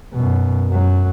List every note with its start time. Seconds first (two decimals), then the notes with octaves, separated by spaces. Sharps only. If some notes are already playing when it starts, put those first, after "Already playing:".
0.14 F#2 B2
0.69 F#2 F#3